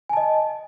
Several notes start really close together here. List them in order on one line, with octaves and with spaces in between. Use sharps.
G#5 A5 D#5